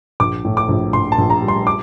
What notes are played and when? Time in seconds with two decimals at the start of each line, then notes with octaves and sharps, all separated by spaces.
0.20 A#1 D6
0.45 A2
0.57 D6
0.69 A#1
0.93 A#1 C6
1.12 A5
1.18 A#1
1.30 A#5
1.42 G3
1.48 C6
1.67 D6